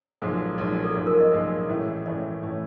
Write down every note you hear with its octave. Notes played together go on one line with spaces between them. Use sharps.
B1 A#2 F3 G#3 G#4
B1 A#2 F3 G#3
A4
B1 A#2 F3 G#3 G#4
A#4
D#5
B1 A#2 F3 G#3
A2 E3 A3 C#4 E4
A2 E3 A3 C#4 E4 D5
A2 E3 A3 C#4 E4